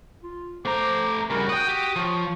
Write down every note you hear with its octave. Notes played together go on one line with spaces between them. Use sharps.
F4
A3 C5 A#5 D6
C#3 G3 F#4 A#4
F#5 G5 D#6
G4
F3 C#5